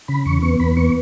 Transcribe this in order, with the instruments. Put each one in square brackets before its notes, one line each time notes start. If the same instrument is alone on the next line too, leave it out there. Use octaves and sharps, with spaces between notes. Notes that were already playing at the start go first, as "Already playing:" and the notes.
[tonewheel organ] C#3 B5
E2 C#6
B3 C#6
E2 B5
B3 C#6